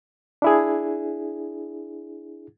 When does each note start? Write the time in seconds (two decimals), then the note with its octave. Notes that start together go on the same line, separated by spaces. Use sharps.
0.42 D4 E4 G#4